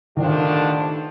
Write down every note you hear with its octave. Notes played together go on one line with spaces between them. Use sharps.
G2 D3 D#3 F3 A3 D4